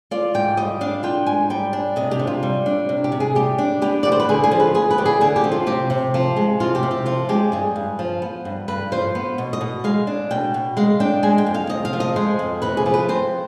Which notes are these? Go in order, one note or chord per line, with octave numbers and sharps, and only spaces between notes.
F4 D5
G#2 G5
G3 D#5
D4 F5
F4 G5
G#2 G#5
G3 G5
D4
C3 D#5
G4
C3
F4
G3
D4
C3
G4
C3
G#4
G3 G4
D4
B3 G4
D2 D5
C5
B4
D3 G#4
G#4
F3
B4
B3 G#4
B4
D2 G4
G#4
D3 G#4
G4
F3
F4
C3 G4
C3
F3
G#3
C3 F4
G4
C3
G4
F3 F4
G#3 G4
G2 G#4
G2
F3
B3
G2
G2 B4
F3 C5
B3
B2
D#5
B2
G#3 F5
D4
B2 G5
B2
G#3 F5
D4 G5
G#3 G#5
G5
F2
F5
C3 D#5
F5
F3
D#5
G#3 C5
F2
C3 B4
G#4
F3
B4
C4 C5